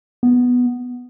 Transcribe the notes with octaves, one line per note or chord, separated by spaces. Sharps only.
B3